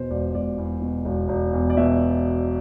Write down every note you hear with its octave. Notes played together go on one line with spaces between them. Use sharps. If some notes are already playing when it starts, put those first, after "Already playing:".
Already playing: E2 B2 C5
E1 D5
E1 D5
E2
B2
E1
E1
E2
D5
B2 E5